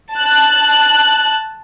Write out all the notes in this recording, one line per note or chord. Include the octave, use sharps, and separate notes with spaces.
A5 F#6